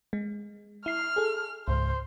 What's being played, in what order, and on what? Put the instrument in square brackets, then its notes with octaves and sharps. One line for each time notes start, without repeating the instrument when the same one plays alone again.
[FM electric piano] G#3
[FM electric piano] E4 C7 [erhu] F6
[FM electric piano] G#4 A4
[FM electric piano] C#2 G#2 [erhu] C5